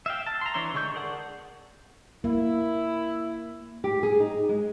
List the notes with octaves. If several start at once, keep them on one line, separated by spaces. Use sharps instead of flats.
E5 F5 G5
A5
A#5 C6
E3 D4 C#5 E5 C6
D3 G#3 A4 C#6 G6
G#4 A#4 D5 F#5 A5
A#3 E4
G4
G#4
D#4
G#3